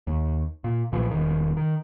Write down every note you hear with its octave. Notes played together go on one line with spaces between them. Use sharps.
D#2
A#2
B1 A#2 E3 F3
E1 D#3
D#3